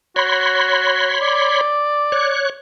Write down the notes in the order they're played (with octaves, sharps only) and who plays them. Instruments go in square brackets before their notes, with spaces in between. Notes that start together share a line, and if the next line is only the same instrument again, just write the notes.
[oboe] F#4 [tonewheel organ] C#5 B5 C6
[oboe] D5
[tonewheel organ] C#5 F#6